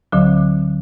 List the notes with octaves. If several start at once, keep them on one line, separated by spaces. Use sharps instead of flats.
D2 D3 F#3